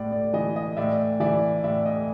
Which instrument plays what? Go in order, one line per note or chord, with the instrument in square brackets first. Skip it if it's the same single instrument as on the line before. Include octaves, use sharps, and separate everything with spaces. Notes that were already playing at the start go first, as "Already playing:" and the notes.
Already playing: [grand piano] A2 D5
D5
E3 D#5
D#5
A2 D5 E5
E3 D5 E5
A2 D5 E5
D#5